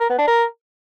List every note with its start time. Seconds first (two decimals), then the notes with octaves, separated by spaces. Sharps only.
0.01 A#4
0.10 B3
0.19 D4
0.28 A#4